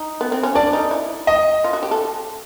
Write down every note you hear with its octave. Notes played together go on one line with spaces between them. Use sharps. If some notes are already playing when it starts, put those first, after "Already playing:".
Already playing: D#4
B3
C4
C#4
D4 D5
D#4
E4
D#5
F4
F#4
G4
A4